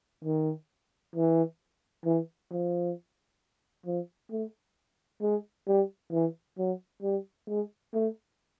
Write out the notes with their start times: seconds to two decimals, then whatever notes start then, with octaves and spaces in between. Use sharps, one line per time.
0.24 D#3
1.15 E3
2.05 E3
2.51 F3
3.86 F3
4.31 A3
5.22 G#3
5.67 G3
6.12 E3
6.58 F#3
7.02 G3
7.48 G#3
7.94 A3